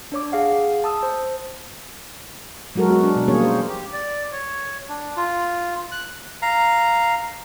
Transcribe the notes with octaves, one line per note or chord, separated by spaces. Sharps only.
D4 C#5 D6
G#4 F5 F#5
A5 D#6 E6
C5
F#3 G#3 F#4 A4 A#4
B3 F#4
D4
B2
F3 G3 A#3 C#4 G#4 C#5
C5
G4
D5
C#5
D4
F4
F#6
F5 A#5